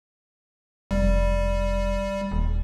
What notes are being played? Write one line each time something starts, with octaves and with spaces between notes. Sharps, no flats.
F1 G3
D#1